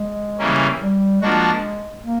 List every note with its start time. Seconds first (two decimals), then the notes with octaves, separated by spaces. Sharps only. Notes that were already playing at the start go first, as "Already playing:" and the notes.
Already playing: G#3
0.38 C#3 E3 G3 A#3 C#4
0.80 G3
1.21 F3 G#3 A#3 D4 F#4
2.04 A#3